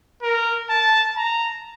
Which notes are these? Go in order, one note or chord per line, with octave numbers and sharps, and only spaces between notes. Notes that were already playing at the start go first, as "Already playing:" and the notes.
A#4
A5
A#5